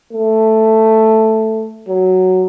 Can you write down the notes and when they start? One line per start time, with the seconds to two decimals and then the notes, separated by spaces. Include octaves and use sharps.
0.13 A3
1.88 F#3